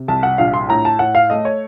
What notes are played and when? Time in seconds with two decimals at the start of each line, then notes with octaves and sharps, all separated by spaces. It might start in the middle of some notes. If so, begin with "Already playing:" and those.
Already playing: C3
0.08 C2 A5
0.23 F#5
0.38 A#1 F5
0.54 C6
0.69 A2 A#5
0.85 A5
0.99 A2 F#5
1.15 F5
1.30 A3 D#5
1.45 C#5